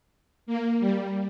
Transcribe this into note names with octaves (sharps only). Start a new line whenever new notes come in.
A#3
G3